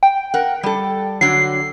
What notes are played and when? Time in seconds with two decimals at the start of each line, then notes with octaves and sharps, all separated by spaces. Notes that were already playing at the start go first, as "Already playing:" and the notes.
0.03 G5
0.34 A#4 F#5
0.63 G3 A4
1.21 D3 F#3 C7